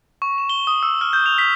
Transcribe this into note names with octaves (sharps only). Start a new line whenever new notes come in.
C#6
E7
G7
D#6
E6
F6
G6
F7
B6